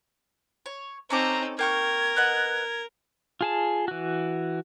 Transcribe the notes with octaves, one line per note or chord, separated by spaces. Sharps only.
C#5
C4 C#4 D#4 A4 A#5 D6
A#3 A#4 G5 C#6 G#6
B4 D#5 F#5
F4 G#4 A5
E3 F#4